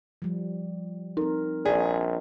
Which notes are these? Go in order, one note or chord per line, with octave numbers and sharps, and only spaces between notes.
F3 G3
C4 D#4 A#4
A#1 G#4 D5